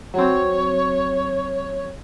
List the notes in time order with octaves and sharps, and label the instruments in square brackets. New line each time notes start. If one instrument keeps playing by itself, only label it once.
[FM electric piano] F#3 C4 [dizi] C#5